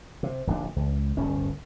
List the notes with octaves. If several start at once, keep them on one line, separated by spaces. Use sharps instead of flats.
C3
D1 A#1 D#2 D4
C#2
D1 G1 G2 C#4